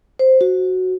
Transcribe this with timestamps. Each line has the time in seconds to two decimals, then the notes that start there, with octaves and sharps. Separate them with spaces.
0.19 C5
0.41 F#4